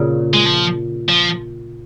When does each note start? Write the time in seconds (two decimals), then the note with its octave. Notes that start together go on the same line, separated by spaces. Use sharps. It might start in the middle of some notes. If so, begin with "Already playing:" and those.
Already playing: A#2 C#3
0.34 G#3
0.46 F3
1.09 F3